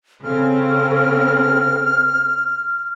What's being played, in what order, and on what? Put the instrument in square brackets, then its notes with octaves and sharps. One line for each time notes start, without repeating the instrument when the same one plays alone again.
[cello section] C#3 C4 [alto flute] A4 [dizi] F6